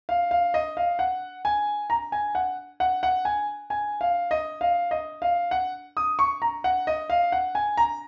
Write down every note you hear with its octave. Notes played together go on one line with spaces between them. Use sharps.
F5
F5
D#5
F5
F#5
G#5
A#5
G#5
F#5
F#5
F#5
G#5
G#5
F5
D#5
F5
D#5
F5
F#5
D#6
C#6
A#5
F#5
D#5
F5
F#5
G#5
A#5